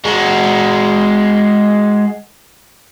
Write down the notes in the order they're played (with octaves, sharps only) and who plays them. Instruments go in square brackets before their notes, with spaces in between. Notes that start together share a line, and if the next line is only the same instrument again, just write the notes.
[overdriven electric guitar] G#3 F#4